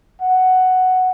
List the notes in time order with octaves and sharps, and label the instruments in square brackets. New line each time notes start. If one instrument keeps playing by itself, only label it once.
[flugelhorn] F#5